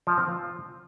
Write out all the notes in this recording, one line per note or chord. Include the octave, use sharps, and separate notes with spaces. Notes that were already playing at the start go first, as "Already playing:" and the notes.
F3
C4
F4